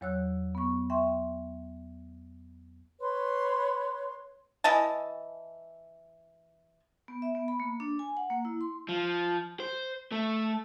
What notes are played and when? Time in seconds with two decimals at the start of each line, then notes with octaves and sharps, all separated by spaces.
0.01 E2 F#3 C#5 E6 F#6
0.55 B3 C#6
0.90 E5 G5 C6 C#6
2.99 B4 C#5 C6
4.64 E3 D#5 G#5 A5
7.08 B3
7.22 E5
7.35 B3
7.48 B5
7.60 A#3
7.80 D4
7.99 G#5
8.17 F#5
8.30 A#3
8.45 E4
8.61 C6
8.89 F3
9.60 C5
10.12 A3